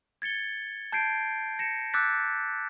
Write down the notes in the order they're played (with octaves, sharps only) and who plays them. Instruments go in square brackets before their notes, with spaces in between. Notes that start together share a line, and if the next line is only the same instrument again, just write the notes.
[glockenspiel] G#6 A6 C#7 G7
A5 G6 G#6 C7 D7
A#6 C#7 E7
D6 E6 F#6 G6 A6 B6